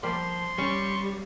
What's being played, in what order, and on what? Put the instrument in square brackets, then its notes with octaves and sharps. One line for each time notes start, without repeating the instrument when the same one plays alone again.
[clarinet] F3 [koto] G3 A#3 [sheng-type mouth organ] C6
[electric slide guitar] G3 [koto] C#4 [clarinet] C#6